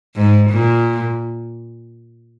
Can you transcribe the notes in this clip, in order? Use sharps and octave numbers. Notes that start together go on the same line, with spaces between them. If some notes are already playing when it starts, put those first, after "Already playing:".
G#2
A#2